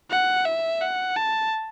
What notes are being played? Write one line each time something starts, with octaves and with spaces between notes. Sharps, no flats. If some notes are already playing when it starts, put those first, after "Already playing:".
F#5
E5
F#5
A5